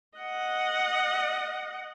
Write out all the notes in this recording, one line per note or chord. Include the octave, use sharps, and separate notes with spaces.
D#5 F#5